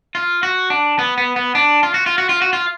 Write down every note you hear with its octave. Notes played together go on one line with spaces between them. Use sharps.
F4
F#4
D4
B3
B3
B3
D4
F4
F#4
F4
F#4
F4
F#4
F4